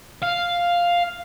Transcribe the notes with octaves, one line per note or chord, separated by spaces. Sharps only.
F5